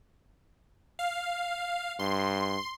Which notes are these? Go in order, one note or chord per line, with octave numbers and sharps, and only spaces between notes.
F5
G2 C6